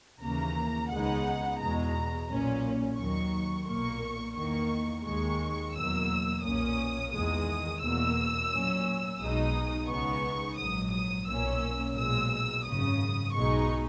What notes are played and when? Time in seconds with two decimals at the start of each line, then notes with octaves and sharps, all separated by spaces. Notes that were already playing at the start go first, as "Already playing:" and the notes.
0.21 D#2 C#3 E3 A#3 A#5
0.90 C#2 C#3 G#3 B3 D#4 F#5
1.59 E2 B2 G#3 A#5
2.29 B1 A#2 A#3 C#4
2.97 D#2 D#3 F#3 C#6
3.66 B1 A#2 A#3 C#6
4.36 E2 D#3 A#3 C#6
5.05 D#2 D#3 G#3 C#6
5.73 E2 B2 F#3 A#3 E6
6.42 B1 A#2 A#3 C#4 D#6
7.12 E2 D#3 G#3 D#6
7.81 E2 B2 A#3 E6
8.50 A#2 F#3 C#4
9.19 B1 B2 G#3 D#4 D#6
9.88 C#2 C#3 G#3 B3 D#4 C#6
10.57 A#1 G#2 F#3 D#6
10.92 D#6
11.27 B1 A#2 A#3 C#4 E6
11.95 B1 A#2 G#3 E6
12.65 G#1 F#2 C#3 D#6
13.33 B1 B2 G#3 D#4 C#6